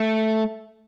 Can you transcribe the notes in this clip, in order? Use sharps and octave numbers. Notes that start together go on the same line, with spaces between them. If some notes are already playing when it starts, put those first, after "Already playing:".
Already playing: A3